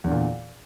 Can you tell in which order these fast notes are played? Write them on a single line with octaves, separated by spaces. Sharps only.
E2 D3 A#2